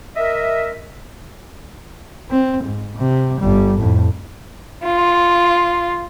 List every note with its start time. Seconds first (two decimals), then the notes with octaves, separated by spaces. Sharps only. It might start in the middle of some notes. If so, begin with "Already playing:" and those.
0.16 A#4 D#5 E5
2.31 C4
2.63 G#2
2.97 C3
3.40 G1 G3
3.79 F2 A2
4.84 F4